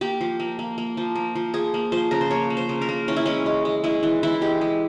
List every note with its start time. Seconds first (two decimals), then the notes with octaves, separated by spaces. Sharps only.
0.01 A#3 G4
0.21 F3
0.40 A#3
0.59 A#3
0.78 A#3
0.97 F3
1.15 A#3
1.36 F3
1.54 F3 G#4
1.74 A#3
1.92 F3 C5
2.11 C#3 A#4
2.21 C5
2.30 A#3 C#5
2.50 A#3
2.57 C5
2.69 C#3
2.81 A#4
2.89 A#3
3.08 E3 C#4
3.16 E4
3.26 G#3 C#4
3.46 G#3
3.65 G#3
3.84 G#3 E4
4.03 E3
4.23 E3 E4
4.41 G#3 G4
4.61 G#3